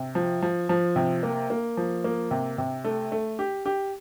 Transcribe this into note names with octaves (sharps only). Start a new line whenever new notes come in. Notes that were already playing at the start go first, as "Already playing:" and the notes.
Already playing: C3
F3
F3
F3
C3
A#3
A#3
F3
A#3
C3
C3
A3
A3
G4
G4